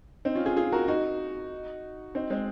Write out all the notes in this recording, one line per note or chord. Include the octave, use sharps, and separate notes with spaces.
C4 D#4
C#4 F4
F4 G#4
F4 G#4
F#4 A#4
D#4 F#4
C4 D#4
G#3 C4